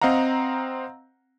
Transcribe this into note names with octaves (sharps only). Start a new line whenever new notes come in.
C4 D#5 F5 F#5 A#5